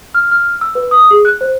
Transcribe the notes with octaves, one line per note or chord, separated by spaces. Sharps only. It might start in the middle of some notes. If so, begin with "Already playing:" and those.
F6
F6
E6
B4
D#6
G#4
F#6
C5